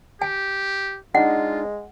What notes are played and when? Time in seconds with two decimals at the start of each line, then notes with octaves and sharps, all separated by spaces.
0.22 G4 G#5
1.15 G#3 D4 D#4 F4 F#5